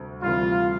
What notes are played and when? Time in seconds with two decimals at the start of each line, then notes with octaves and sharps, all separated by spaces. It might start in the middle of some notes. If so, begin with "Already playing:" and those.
Already playing: D2 C3 G3
0.22 D2 C3 E3 G3 F4